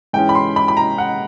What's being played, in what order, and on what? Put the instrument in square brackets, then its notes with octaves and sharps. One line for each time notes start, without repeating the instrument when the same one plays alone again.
[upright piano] G#2 E3 G#3 C#4 G5
B5
C6
B5
B5
A#5
F#5